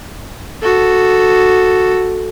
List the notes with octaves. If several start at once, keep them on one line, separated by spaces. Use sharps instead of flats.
F#4 A4